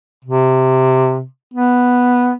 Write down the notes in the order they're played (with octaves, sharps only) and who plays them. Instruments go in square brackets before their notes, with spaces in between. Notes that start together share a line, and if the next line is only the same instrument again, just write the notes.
[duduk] C3
B3